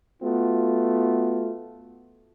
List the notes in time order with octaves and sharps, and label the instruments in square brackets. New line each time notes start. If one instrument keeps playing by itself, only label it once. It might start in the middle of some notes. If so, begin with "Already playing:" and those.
[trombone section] A3 B3 F4 F#4